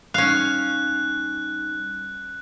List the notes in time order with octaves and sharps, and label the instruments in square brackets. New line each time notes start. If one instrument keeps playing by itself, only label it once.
[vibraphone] G3 D#4 [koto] C#4 F5 [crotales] F#6